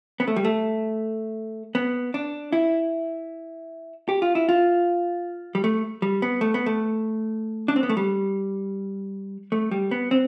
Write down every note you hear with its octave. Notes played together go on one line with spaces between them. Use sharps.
B3
A3
G3
A3
B3
D4
E4
G4
F4
E4
F4
G3
A3
G3
B3
A3
B3
A3
D4
C4
B3
A3
G3
A3
G3
B3
C4